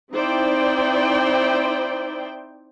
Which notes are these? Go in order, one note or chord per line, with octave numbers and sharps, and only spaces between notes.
C4 D#4 E4 C5 D5 G5